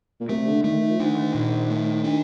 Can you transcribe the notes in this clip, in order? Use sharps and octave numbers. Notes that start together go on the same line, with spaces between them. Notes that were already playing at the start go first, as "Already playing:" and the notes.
A#2
C3 A3
D3
D#3 A3
D#3
F3
D#3 D4
A#2
A3
D4